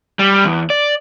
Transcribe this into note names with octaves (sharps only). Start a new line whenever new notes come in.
G3
E2
D5